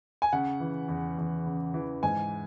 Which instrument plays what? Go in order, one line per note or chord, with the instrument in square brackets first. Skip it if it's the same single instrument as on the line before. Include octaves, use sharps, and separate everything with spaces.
[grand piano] G#5
C#3 F#5
E3
E2
E2
C#3
E3
G#2 G#5